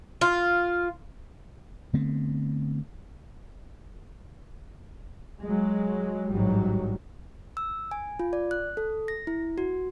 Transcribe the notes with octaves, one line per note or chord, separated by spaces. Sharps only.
F4
D3 A3 B3 C4
F#3 G#3
A1 G#2 F#3 G3
E6
G#5
F4
D5
F#6
A4
A#6
E4
F#4